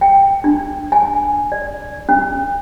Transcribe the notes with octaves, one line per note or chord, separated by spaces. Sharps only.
G5
D4
G#5
D5
C#4